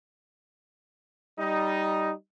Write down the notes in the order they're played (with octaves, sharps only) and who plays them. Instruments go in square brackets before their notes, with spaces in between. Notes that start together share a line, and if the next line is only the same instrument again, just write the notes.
[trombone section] G3 D#4